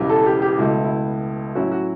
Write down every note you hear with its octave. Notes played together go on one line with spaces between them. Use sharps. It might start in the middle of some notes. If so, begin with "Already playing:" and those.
Already playing: E1 E2 C#3 E3 G3
A4
G4
G4
C#2 B2 A3 E4
E4
A2 F#3 C#4 E4 F#4
F#4